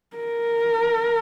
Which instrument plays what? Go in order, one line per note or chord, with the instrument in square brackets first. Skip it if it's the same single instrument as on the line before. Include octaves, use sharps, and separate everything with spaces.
[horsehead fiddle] A#4